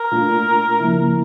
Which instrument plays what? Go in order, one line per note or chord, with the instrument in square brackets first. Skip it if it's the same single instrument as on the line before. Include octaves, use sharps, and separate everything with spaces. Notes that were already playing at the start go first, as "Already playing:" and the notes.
Already playing: [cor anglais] A#4
[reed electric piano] A#2 A3 D4 F4
C#3 F3 A#3 E4